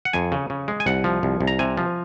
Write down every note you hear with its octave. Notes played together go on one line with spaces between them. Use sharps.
F#5
F2 G#5
C#3
C#3
G#3
G#5
C2 F#5
F3
C2
C2
A#5
C3 G#5
F3